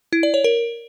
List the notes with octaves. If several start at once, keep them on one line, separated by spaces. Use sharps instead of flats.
E4
D5
C#5
A#4